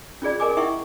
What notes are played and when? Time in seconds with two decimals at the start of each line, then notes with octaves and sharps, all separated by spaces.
0.22 C#4 F4 G#4 D5
0.40 G#4 A#4 D#5 G#5 D6
0.57 E4 E5 F#5 G5 C#6